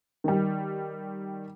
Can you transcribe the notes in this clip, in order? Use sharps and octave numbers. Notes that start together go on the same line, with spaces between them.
D#3 G3